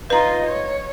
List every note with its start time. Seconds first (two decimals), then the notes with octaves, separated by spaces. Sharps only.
0.10 D#4 F4 B4 A#5
0.46 C#5